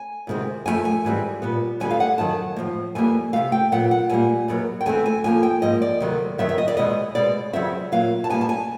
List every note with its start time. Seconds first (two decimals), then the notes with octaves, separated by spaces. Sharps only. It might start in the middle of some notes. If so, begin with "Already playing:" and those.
Already playing: G#5
0.27 D2 C3 D#3 G#3 C4
0.65 F#2 C#3 F3 A3 G#5
0.85 G#5
1.05 G#2 E3 G3 C4
1.42 A#2 G3 B3
1.80 D2 D3 G3 B3 G#5
1.91 F5
2.00 F#5
2.18 F#2 D#3 F#3 A5
2.56 A2 F3 A#3
2.95 F2 C3 E3 G3 A#3 G#5
3.33 C3 F3 A3 F5
3.52 G5
3.72 A#2 F#3 B3 F#5
3.91 F#5
4.10 A#2 G3 A#3 G#5
4.48 E2 B2 F#3 A#3
4.81 G5
4.85 D2 C#3 E3 A3 C4 G#5
5.06 G#5
5.24 F2 D3 F3 A#3 G#5
5.43 G5
5.62 G#2 F3 A#3 D#5
5.82 D5
6.00 D2 C3 D#3 F#3
6.38 F#2 D#3 F#3 B3 E5
6.49 E5
6.58 D#5
6.68 D5
6.77 E2 B2 G#3 B3 D#5
7.15 B2 G#3 C4 D5
7.53 E2 C#3 F#3 C4 E5
7.92 A#2 F#3 A#3 F5
8.24 A5
8.30 B2 G3 A#3 G#5
8.41 A5
8.49 G#5